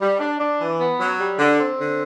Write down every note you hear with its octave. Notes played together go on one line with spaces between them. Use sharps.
G3
D4
D4
E3
B3
F#3
G3
D3
C4
D3